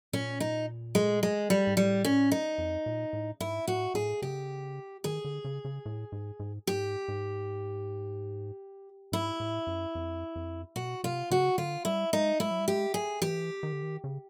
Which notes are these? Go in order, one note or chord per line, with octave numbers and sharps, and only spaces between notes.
A#2 C#4
D#4
G#3
G#3
G3
G#2
A2 G3
C#4
D#4
F2
A#2
A2
G#2 E4
A2 F#4
A2 G#4
C#3 G4
D#3 G#4
D3
C#3
C#3
A2
G#2
G#2
G#2 G4
G#2
G#2 E4
A2
F#2
F2
F2
B2 F#4
C3 F4
C#3 F#4
D3 F4
G3 E4
G#3 D#4
G#3 E4
F#3
G3
G#3 G4
G#4
E3 G4
D#3
D3
D#3
C#3